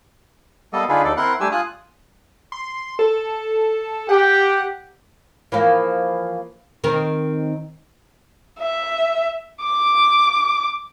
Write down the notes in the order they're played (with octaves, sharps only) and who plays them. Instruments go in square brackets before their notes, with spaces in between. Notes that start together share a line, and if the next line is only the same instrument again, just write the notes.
[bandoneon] G3 A#3 B3 A4 D#5
D3 D4 D#4 F4 G#4 B4
D#2 D#4 A4 D5
C4 E4 A#4 F#5 C6 F#6
G3 A3 D4 G4 G#5 E6
F4 G#5 D#6 F#6
[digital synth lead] C6
A4
[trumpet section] G4 [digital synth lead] F#5
[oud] E3 F3 A#3
D#3 C4 A#4
[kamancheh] E5
D6